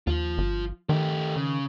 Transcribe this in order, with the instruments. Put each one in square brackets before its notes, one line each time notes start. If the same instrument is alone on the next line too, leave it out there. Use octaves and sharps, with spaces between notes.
[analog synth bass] D#2 [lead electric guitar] F3 F4
[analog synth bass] G1
[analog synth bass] D#3 [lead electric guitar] A3 G4
[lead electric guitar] C#3